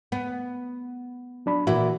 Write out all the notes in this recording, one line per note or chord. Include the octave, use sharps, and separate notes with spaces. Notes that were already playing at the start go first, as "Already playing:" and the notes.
B3
F#3 D4 B5
A#2 E3 E4 F#4